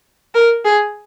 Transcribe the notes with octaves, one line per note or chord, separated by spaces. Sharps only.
A#4
G#4